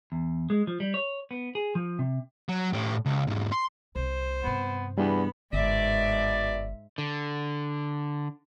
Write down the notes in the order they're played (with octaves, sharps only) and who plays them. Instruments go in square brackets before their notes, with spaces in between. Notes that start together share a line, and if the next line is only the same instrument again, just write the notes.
[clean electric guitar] E2
G#3
F3
G3
C#5
B3
G#4
F3
C3
[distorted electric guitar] F#3
A2 G4
C#2
E2 G#2
C6
[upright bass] C2 C3 [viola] C5
[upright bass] G2 C3 [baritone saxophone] B3
[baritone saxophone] E2 [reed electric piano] G3 D4 [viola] B3 B5
[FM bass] G1 [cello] G#2 E5 [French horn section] B2 D5
[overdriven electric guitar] D3